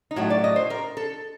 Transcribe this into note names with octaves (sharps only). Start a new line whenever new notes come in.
D#4
A2 F#3 A3 F#4
D5
D#5
C5
A#4
A4